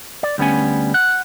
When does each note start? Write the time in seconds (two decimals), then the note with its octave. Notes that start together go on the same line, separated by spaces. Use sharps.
0.23 D5
0.38 D2 G3 B3 C#4 G#5
0.94 F#5